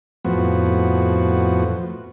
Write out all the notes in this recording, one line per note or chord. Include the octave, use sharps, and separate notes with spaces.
F2 A2 F3 B3 F#4